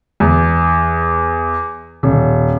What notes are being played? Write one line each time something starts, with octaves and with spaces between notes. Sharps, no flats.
E2
D#1